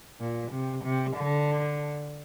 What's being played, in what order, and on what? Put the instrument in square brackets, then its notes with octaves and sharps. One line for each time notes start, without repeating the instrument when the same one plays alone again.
[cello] A#2
C3
C3
D3